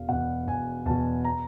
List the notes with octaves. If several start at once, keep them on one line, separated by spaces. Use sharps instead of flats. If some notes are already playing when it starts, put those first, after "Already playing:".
Already playing: E1 F5
E2 B2 F#5
E1 G#5
E2 B2 A5
A#5